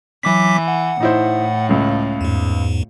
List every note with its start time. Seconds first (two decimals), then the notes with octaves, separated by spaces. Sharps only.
0.23 E3 F#3 D6 B6
0.68 F#5
1.00 A2 D#4 E4 C5
1.69 C#2 C#3
2.21 E2 G#2